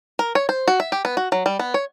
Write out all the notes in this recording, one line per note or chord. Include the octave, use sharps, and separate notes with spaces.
A#4
C#5
C5
F#4
E5
G4
B3
F#4
F#3
G3
B3
C#5